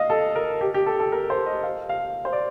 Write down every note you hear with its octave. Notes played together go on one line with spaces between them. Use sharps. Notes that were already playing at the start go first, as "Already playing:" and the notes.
Already playing: D#5 F5
A4
A#4
G4
G4
A4
A4
A#4
C5
D#5
F5
F5
C5
D5